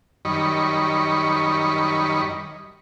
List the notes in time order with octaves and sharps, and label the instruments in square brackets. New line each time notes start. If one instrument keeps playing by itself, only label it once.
[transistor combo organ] F#2 D#3 G3 D#5 B5 C#6